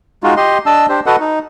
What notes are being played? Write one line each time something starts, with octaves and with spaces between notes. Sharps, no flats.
G#3 D#4 F4 F#4
G4 D#5 C6
D4 D#5 A5 E6
D4 G4 C5
F#4 A4 B4 D#5 F#5
D#4